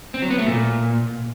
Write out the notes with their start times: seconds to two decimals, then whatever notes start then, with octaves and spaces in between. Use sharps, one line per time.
0.14 C4
0.22 F#3
0.30 B3
0.38 A3
0.47 A#2